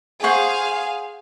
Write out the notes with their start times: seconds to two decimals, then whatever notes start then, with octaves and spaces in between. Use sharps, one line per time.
0.24 G#4 C5 F5 F#5 C#6